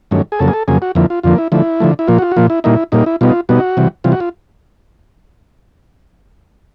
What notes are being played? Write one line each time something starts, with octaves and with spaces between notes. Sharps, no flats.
G2 D#3 F#3 A3 C#4
G#4
F2 C#3 F#3 A#3 A4
G#4
A4
F2 C#3 F#3 A#3 G#4
F#4
F2 D3 F3 A#3 E4
F4
F2 D3 F3 A#3 F4
E4
D3 F3 A3 E4
D3 F3 A3
E4
A#2 F3 A#3 F4
F#4
F4
F#4
A#2 F3 A#3 F4
E4
A#2 G3 A#3 D#4 E4
A#2 G3 A#3 D#4
E4
B2 G3 B3 D#4 F4
B2 G3 B3 D#4 F#4
C3 E3 G3
C3 E3 G3 F4
F#4
F4